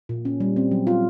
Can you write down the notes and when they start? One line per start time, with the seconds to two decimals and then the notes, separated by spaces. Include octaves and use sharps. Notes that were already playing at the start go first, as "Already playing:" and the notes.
0.09 A#2
0.25 C#4
0.40 G3
0.56 C4
0.71 F#3
0.87 F4